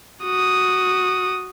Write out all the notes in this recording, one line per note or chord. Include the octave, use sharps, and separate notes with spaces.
F#4 D#6